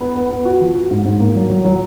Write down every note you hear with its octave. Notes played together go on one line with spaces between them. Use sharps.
B3
B3
B3
F#4
F3
F#4
G#2
G#2
A#3
F#3
F#3
F#3